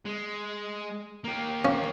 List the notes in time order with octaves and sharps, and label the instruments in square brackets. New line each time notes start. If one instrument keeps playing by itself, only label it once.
[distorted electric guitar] G#3
A#3 G4
[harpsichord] C#4 F5